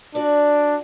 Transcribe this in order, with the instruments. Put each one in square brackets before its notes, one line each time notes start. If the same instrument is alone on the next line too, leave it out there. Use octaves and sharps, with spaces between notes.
[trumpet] D4 [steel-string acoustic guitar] F#4 D5